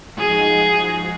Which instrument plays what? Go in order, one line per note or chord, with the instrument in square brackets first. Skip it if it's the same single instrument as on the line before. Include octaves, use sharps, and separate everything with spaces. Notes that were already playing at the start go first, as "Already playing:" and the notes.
[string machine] F3 G#3 D#4 F#4 [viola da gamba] G#4